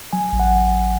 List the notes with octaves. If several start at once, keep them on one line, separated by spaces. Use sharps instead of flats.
F#3 G#5
A1
F#5